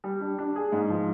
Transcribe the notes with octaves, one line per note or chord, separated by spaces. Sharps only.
G3
D4
D4
G#4
G#2
F3